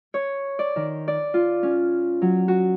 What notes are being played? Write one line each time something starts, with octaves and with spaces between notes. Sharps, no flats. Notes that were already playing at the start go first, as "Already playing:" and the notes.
C#5
D5
D#3
D5
F4
C#4
F#3
F#4